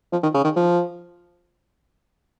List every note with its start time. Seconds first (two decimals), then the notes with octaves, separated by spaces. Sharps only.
0.13 F3
0.23 D#3
0.34 C#3
0.44 D#3
0.56 F3